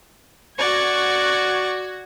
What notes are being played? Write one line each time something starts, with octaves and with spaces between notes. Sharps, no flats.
F#4 D5 C#6 G#6